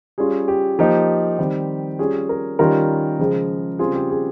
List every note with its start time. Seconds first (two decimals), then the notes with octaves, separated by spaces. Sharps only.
0.18 G3 C#4 F4 G#4
0.48 G4
0.79 F3 A#3 D#4 G4
1.39 D#3 G3 C4
1.99 G3 C#4 F4 G#4
2.29 A#4
2.59 D#3 G3 C#4 F4 A#4
3.19 C#3 F3 G#3
3.79 C#3 G3 C4 F4 G#4
3.94 G4
4.10 G#4